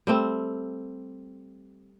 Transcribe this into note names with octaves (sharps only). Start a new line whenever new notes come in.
G3 A3 C4